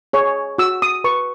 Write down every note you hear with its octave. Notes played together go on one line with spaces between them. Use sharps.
G#4 C#5
F#4 E6
D#6
B4 C#6